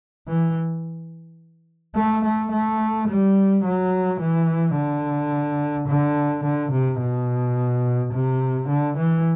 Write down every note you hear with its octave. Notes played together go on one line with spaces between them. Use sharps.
E3
A3
A3
A3
G3
F#3
E3
D3
D3
D3
C3
B2
C3
D3
E3